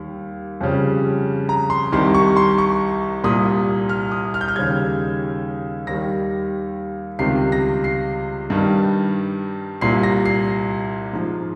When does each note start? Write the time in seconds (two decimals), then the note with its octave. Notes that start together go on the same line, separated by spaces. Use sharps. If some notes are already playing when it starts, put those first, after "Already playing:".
Already playing: D#2 G3
0.60 F2 C#3 G3
1.49 A#5
1.70 C6
1.92 C2 C3 D#3 G3 C6
2.14 C#6
2.37 C6
2.58 C#6
3.23 C2 A#2 G3 D#6
3.89 F6
4.12 D#6
4.34 F6
4.41 G6
4.48 F6
4.55 D#2 C#3 G3 G#6
5.87 D#2 D#3 G3 A#6
7.19 C#2 C3 D#3 G3 C7
7.52 A#6
7.84 C7
8.50 G2 D#3 G3
9.81 C2 A#2 G3 C7
10.03 A#6
10.25 C7
11.13 G#2 F3